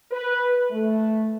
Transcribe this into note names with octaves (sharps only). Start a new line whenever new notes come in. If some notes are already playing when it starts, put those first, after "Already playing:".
B4
A3